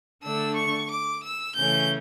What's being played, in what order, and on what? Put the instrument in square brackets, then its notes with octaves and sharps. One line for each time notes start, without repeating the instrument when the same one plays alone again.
[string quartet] D3 A3 D4 E6
C#6
D6
E6
C#3 E3 A3 C#4 G6